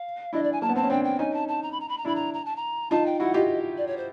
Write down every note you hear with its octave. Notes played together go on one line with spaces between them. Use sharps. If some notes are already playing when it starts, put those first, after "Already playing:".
Already playing: F5
D4 E4 D#5
D5
G#5
A#3 A5
B3
C4 A5
C#4
C4 D4 G5
G5
C#4 D#4 G#5
A5
A5
A#5
B5
A#5
B5
A#5
D4 E4 B5
A#5
A#5
A5
A#5
D#4 F4 A5
G5
E4 F#4 F#5
F4 G4 D#5
D5
C#5
C5